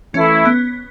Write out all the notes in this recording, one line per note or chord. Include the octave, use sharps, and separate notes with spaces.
E3 A3 C#4 E4
B3